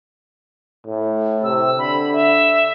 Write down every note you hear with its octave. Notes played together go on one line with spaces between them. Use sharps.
A2
C3 E6
D3 B5
E5